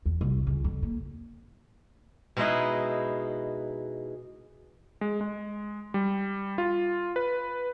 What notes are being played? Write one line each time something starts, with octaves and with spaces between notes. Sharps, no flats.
E2
C2
C#2
F2
A#3
B2 G#3 D#4 E4 B4 D#5
G#3
G#3
G3
F4
B4